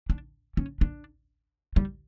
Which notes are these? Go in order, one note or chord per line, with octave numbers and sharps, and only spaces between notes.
D4
C#4
D4
G3